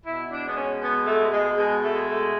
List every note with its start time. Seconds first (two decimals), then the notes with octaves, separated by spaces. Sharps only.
0.06 B2 E4
0.31 D4
0.44 G#3 B3
0.57 C#4
0.81 B2 B3
1.06 A3
1.19 G#3
1.31 G#3
1.57 B2 G#3
1.82 A3
1.95 G#3
2.07 A3